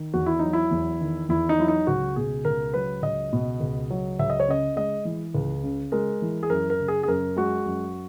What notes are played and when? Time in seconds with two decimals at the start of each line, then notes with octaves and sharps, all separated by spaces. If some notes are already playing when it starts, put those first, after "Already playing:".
Already playing: D#3
0.14 E2 F#4
0.26 E4
0.39 F#3 D#4
0.53 E4
0.71 E2
1.01 D#3
1.29 E2 E4
1.49 D#4
1.58 F#3 E4
1.68 D#4
1.87 C#2 F#4
2.16 B2 G#4
2.45 C#2 A#4
2.74 F#3 B4
3.03 C#2 D#5
3.33 B2
3.60 C#2
3.91 F#3
4.19 C#2 E5
4.30 D#5
4.40 C#5
4.48 C#3 D#5
4.76 G#3 D#5
5.05 E3
5.35 C#2
5.63 C#3
5.92 G#3 A#4
6.22 E3
6.43 G#4
6.50 F#2 A#4
6.70 A#4
6.80 C#3
6.88 G#4
7.03 G#4
7.08 F#2 A#4
7.36 G#3 F#4
7.66 F#2